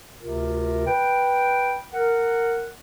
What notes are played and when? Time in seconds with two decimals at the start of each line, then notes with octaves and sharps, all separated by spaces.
0.20 D2 C3 F4 A#4
0.86 B4 G5
1.93 A#4 F#5